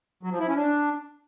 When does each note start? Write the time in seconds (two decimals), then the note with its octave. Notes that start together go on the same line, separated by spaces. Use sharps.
0.23 F#3
0.31 F3
0.40 E4
0.48 C#4
0.56 D4